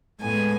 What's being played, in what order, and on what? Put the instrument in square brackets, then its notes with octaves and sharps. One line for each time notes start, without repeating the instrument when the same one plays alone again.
[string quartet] A2 G#3 B3 G#5